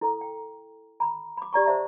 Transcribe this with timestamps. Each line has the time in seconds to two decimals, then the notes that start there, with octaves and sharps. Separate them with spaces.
0.01 E4 A4 A#5
0.21 G5
1.00 A#5 B5
1.37 B5 D6
1.53 G4 D5 A#5 C#6
1.65 C5 D5 E5 A5 A#5